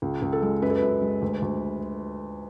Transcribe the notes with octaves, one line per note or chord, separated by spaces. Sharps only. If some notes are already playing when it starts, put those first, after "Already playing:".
C#2
C#2
A4
G#3
F#2 B4
A4
F#2 B4
G#3
D2
D2